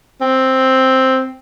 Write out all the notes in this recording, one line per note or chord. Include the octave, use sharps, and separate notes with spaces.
C4